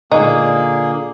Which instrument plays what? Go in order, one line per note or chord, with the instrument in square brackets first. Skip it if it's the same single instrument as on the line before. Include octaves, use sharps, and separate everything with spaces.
[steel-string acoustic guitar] A#2 D3 [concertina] A#3 G#4 [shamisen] D#4